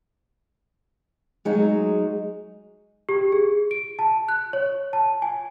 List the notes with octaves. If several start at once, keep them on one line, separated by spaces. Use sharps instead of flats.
F#3 G#3 D#4 F#4
G4
G#4
D7
A5
F#6
C#5
A5
G#5